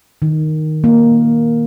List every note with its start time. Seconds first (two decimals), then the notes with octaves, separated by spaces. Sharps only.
0.22 D#3
0.84 A#3